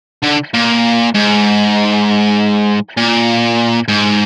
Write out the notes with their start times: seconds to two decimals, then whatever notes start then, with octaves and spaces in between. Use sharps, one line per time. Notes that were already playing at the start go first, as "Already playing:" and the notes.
0.22 D3
0.54 A#2
1.15 G#2
2.97 A#2
3.88 G#2